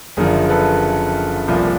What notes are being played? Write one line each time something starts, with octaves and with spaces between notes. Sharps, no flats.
F#1 F#2 D3 F3 G#4 A#4
A4 B4
C2 A#2 F3